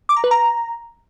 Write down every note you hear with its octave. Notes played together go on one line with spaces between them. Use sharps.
D6
A#5
B4
A#5